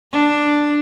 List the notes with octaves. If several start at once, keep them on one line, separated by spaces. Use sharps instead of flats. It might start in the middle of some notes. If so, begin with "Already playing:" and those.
D4